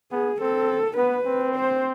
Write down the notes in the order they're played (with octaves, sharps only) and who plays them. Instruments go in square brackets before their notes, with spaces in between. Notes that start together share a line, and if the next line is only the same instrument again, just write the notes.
[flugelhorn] B3 [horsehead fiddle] G#4
[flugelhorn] C4 [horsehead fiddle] A4
[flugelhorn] B3 [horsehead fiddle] B4
[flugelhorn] C4
[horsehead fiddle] C5